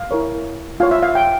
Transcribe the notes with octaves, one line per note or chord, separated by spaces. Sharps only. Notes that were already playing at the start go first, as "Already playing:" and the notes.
Already playing: F5
E4 A#4 C#5
F4 C#5 F5
E5
F5
G5